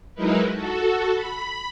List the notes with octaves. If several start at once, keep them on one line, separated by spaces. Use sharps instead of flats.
F#3 G#3 D#4 E4 A#4 B4
F#4 A4
B5